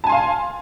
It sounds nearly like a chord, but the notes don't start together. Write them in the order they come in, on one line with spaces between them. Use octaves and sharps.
A5 G#5 C6 F5